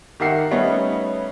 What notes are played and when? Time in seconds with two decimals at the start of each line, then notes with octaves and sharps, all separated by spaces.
0.20 D#3 G4 A#4 E5 F#5 C7
0.51 G3 A3 B3 C#4 D#4